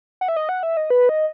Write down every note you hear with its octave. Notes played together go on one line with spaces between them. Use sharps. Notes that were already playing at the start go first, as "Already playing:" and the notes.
F#5
E5
D#5
F#5
E5
D#5
B4
D#5